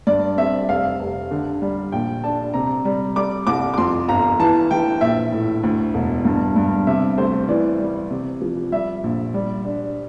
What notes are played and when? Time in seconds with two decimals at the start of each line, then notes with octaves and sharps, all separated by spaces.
0.07 G2 D5
0.38 C4 E5
0.68 F1 F5
1.00 F1
1.31 D3
1.62 G3
1.92 A#1 G5
2.24 D4 A5
2.54 C3 A#5
2.85 G3
3.16 G3 D6
3.47 C2 D6
3.74 D6
3.78 F2 C6
4.08 G1 A#5
4.40 E3 A5
4.71 E3 G5
5.01 A#1 E5
5.32 A2
5.63 D2
5.94 E1
6.25 G2
6.56 G2
6.87 C3 E5
7.18 D2 C5
7.49 E3 D5
7.80 G3
8.11 C3
8.41 F3
8.72 G3 E5
9.04 A#1
9.34 G3
9.65 D4